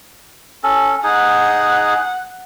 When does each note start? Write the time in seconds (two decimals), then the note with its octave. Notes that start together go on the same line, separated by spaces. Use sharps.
0.63 C#4 A4
1.04 D#4 G#4 F#5